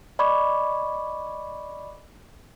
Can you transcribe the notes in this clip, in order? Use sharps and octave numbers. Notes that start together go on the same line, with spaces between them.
D5 D#5 B5 C#6 D6 G#6